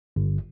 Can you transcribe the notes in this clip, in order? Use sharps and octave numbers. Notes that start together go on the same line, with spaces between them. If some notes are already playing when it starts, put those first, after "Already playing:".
G1